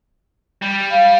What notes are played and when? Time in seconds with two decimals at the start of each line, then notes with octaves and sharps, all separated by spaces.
0.62 G3
0.91 F5